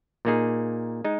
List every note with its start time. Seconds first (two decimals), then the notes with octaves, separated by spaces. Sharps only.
0.25 A#2 A#3 D#4 G#4
1.05 G#3 D#4